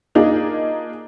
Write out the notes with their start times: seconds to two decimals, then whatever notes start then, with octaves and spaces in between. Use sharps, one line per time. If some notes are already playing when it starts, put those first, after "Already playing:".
0.15 A#3 D4 D#4 F4 G#4